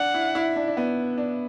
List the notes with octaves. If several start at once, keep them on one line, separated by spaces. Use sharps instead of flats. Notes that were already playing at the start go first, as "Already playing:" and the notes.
Already playing: D4 F#5
E4
E4
D4
D4
B3
D4